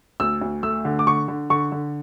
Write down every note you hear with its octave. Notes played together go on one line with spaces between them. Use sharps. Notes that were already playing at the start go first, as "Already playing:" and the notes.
D2 E6
D2
A3 E6
D3
D6
D3 C#6
D3
D3 C#6
D3